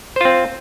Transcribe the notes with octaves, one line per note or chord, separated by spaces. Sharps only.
C4 F4 C5